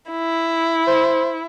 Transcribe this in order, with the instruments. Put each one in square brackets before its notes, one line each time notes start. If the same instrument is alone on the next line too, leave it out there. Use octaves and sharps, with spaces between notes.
[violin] E4
[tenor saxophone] C5